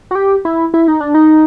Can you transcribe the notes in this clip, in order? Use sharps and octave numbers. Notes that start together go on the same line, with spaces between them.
F#4
G4
E4
E4
D#4
D4
D#4